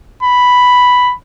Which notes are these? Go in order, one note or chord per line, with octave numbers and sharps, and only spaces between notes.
B5